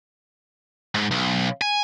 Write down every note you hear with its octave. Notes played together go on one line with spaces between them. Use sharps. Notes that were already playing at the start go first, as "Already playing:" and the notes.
G#2
B1
G#5